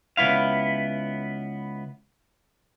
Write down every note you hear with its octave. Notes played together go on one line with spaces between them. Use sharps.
C#2 A#2 B3 E4 F5